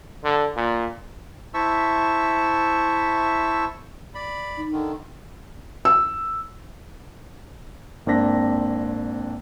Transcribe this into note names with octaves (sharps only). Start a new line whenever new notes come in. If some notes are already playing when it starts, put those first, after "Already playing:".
D3
A#2
E4 C5 E5 A5 C#6 E6
D5 B5
D#4
D3 D#3
E6
G#1 A#3 C4 D4 A#6 B6